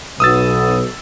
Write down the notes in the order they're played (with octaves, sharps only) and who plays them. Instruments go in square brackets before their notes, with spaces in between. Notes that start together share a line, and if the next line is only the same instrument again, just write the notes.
[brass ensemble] B1 B2 [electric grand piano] D#6 E6 A6